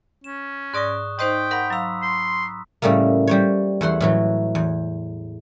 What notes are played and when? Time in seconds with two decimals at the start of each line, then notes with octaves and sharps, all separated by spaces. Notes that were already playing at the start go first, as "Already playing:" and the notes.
0.24 C#4 E7
0.74 G#2 D5 C#6 D#6 F#6 A#6
1.19 D#4 C5 D#5 G5 C6 D#6 B6
1.51 A#4 F#5 B5 A#6 B6
1.70 F#3 F5 A#5 E6
2.03 C6
2.82 A2 C#3 G3 A3 A#3
3.27 G3 C5 C#5
3.81 E2 A3 F#5 C6
4.00 A2 E3 F#3
4.55 E2